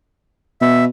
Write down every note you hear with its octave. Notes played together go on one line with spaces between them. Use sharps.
B2 E5